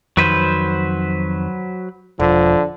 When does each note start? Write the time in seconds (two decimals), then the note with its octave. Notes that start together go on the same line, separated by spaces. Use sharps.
0.17 F2 D#3 F#3 B4 C5
2.20 E1 D3 F3